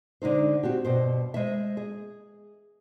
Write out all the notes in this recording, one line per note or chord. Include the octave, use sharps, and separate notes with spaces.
D3 G#3 D#4 C5
C4 F#4 G4
G2 B2 C5
G#3 C5 E5
G#4